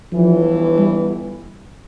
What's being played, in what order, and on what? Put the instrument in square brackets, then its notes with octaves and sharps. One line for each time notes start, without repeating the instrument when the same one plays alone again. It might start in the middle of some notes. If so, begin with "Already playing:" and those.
[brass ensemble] G1 G2 E3 [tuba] F3
[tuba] G3